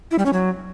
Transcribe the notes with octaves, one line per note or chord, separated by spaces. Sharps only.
E4
G3
C#4
F#3